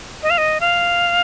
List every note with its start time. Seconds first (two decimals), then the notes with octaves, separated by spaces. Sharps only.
0.23 D#5
0.30 F5
0.38 D#5
0.61 F5